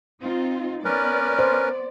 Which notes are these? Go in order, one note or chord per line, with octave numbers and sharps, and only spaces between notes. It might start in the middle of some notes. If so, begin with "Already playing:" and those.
C4 D#4 F4
B3 C#4 A#4 B4 D5
C5